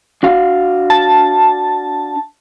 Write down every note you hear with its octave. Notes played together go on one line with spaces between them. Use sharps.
D4 F#4 F5
A5